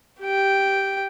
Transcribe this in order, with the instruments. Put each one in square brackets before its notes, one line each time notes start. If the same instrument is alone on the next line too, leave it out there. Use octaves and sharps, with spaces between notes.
[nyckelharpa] G4 G5